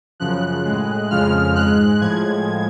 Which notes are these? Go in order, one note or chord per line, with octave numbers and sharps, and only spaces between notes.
F#2 C#3 F3 F#6
A2 G#3
F2 C#3 F3 G#3 F6
G#2 G#3 F#6
A2 F3 G#3 G#6